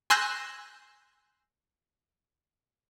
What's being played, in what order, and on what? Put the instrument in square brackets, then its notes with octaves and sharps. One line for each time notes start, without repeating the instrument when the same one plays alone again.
[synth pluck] G#5 C6 E6 F#6 G6 A#6